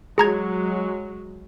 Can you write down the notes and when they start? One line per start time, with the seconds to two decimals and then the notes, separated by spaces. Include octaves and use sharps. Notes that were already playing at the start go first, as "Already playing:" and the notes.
0.18 F#3 G#3 G#4 A#5 G#6